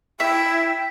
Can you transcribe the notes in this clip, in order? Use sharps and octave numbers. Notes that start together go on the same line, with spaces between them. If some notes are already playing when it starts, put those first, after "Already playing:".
E4 E5 G5